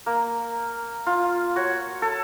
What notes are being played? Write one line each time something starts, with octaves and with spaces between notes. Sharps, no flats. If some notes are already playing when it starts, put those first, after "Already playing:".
A#3
F4
F#4 C#5
A4